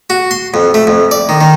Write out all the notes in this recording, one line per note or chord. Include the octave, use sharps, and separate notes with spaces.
F#4
C6
F2
A3
F2
D5
D#3
D#3